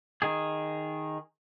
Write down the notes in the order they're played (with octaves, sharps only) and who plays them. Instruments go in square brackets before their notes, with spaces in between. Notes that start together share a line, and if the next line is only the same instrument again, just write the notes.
[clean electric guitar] D#3 G#4